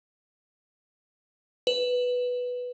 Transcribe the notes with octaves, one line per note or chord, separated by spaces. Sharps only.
B4